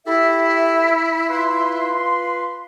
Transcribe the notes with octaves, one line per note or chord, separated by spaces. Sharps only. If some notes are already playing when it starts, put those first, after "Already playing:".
E4 G4 A4 E5
F4 B4 C6